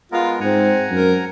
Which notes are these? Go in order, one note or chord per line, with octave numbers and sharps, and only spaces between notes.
G#3 B3 F4 A#4
G#2 C4 F#5 G#5 A#5
F#2 A#4